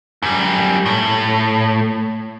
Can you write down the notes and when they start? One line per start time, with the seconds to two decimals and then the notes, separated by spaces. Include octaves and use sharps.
0.23 F#2 G3
0.86 A2